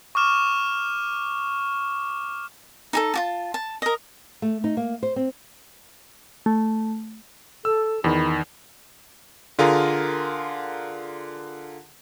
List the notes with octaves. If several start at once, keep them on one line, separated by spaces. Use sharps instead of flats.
C#6 D6 F6 E7
D#4 G#4 A4
F4 F#4 A5
A5
A#4 D#5
A3
D#4
A#3
C5
C4
A3
A4 E6
E2 D#3 B5
D3 F4 G#4 A#4 A#5